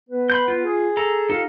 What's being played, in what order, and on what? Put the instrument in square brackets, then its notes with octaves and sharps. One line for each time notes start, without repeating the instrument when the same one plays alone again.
[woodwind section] B3 B4
[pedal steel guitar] B5 C6 G6
F4
[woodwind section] G#4
[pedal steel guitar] A4 A#5
[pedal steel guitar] D#4 A4 [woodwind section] F4 G4 F5